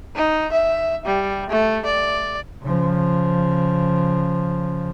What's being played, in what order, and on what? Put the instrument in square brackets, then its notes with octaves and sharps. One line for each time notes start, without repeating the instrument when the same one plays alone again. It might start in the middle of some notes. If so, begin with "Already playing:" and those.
[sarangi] D#4
E5
G3
A3
D5
[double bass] C#3 F3